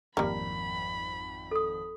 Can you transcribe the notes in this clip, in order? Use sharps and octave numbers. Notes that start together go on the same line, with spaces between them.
G#1 F2 G3 A#3 B5
A4 D#6